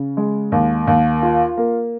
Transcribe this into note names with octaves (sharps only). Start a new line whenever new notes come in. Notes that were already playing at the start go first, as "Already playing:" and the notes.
Already playing: C#3
G#3
D#2
D#2
F4
A#3